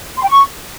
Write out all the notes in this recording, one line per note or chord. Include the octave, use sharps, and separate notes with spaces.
C6
G5
C#6